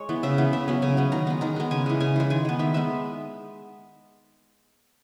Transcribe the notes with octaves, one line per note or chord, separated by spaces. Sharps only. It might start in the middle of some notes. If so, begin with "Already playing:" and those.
Already playing: G#3 C#5
E3 B3
C#3 E5
E3 B3
C#3 E5
F#3 B3
C#3 G#5
F#3 B3
D#3 A#5
G#3 B3
D#3 A#5
G#3 B3
C#3 G#5
E3 G#3
C#3 G#5
E3 G#3
D#3 G#5
G#3 B3
D#3 E5
G#3 B3 E5